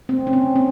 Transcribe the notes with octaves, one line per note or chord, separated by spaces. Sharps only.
C4
C#4
C4
C4